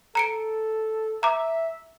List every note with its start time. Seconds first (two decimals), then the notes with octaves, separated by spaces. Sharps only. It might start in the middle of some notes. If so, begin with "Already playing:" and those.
0.15 A4 A#5 C#7 D7
1.23 E5 A#5 D6